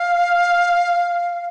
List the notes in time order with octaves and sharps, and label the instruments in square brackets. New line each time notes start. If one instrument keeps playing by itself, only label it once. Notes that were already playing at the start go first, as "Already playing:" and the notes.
Already playing: [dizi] F5